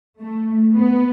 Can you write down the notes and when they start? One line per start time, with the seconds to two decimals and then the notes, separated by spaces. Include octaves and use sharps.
0.20 A3
0.74 B3